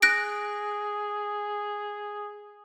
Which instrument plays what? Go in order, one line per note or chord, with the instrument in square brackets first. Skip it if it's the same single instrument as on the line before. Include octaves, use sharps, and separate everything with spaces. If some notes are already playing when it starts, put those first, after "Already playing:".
[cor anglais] G#4 [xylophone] F#6 A#6 D7